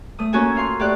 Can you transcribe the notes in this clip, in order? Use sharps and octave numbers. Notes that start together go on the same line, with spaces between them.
A3 D#6
A#3 C#4 F#4 A4 G#5 A5
F4 F5 C6
A2 G4 D5 F#6